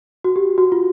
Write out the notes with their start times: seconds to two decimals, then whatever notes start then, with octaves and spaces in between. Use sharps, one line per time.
0.24 F#4
0.36 G4
0.58 F#4
0.72 F4